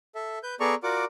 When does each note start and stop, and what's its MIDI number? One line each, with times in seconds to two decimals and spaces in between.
0.15 0.39 69
0.15 0.39 76
0.43 0.55 71
0.43 0.55 91
0.60 0.75 59
0.60 0.75 68
0.60 0.75 69
0.60 0.75 74
0.60 0.75 82
0.60 0.75 85
0.83 1.05 65
0.83 1.05 66
0.83 1.05 70
0.83 1.05 74
0.83 1.05 78
0.83 1.05 86